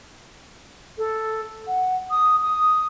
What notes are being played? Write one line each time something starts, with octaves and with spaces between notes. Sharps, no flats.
A4
F#5
D#6
D#6